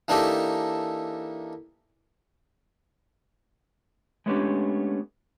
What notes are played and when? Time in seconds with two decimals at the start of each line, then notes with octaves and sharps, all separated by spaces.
0.08 E3 A#3 D4 D#4 G4 A4
4.26 G#3 A3 B3 C#4 D4 G4